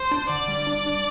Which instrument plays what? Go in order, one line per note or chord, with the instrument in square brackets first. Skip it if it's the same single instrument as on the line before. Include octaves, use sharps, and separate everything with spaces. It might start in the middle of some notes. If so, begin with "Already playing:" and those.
Already playing: [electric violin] C5
[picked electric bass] D4
[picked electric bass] D3 [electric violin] D5
[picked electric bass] G3
D4
D4